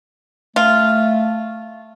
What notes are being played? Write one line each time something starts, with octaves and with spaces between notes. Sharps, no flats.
A3 F4